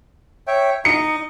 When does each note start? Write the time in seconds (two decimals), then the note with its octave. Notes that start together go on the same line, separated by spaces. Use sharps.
0.47 C#5 E5 G5
0.85 D#4 D#5 C#7